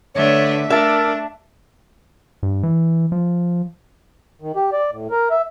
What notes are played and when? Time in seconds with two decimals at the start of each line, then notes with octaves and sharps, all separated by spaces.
0.15 D3 A3 D4 B4 C#5 E5
0.70 A3 D4 A#4 E5 A5
2.43 G2
2.63 E3
3.12 F3
4.42 D#3
4.56 G4
4.72 D5
4.92 A2
5.11 A#4
5.30 E5